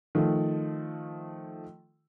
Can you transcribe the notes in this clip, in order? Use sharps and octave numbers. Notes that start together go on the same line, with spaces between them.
D#3 F3 A3